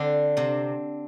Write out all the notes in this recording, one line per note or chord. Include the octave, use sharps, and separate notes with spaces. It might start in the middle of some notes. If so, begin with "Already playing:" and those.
Already playing: D3 C4 D4
C3 C4